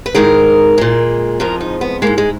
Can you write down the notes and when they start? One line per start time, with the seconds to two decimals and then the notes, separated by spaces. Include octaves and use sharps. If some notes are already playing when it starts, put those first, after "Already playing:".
0.06 B4
0.15 G#2 D#3 G#3 A#4
0.78 A#2 G#3
1.40 F2 F3 G#3 A#4
1.61 D#4
1.81 B3
2.02 F3 G#3 A#3
2.07 G#2
2.18 G#3